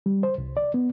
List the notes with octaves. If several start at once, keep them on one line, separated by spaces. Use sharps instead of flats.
G3
C5
C2
D5
B3